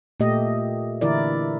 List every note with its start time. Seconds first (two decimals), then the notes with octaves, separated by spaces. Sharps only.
0.20 A#2 A3 G4 D#5
1.01 D3 E3 E4 A#4 D5